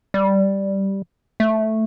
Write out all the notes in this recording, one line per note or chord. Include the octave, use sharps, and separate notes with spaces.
G3
A3